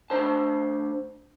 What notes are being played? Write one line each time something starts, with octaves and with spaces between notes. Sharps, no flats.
D2 D4 C5 A5